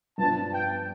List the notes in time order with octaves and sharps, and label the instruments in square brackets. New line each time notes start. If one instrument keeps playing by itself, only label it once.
[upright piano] G2 F3 B3 D4 [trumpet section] A5
[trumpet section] G5